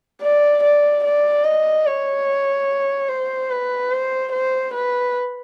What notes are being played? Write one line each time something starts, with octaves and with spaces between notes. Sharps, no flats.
D5
D5
D5
D#5
C#5
C5
B4
C5
C5
B4